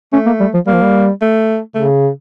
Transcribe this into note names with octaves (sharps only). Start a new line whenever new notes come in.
A3 C#4
A#3
G3
F3
G3 A#3
F3
G3
A3
C#3 A3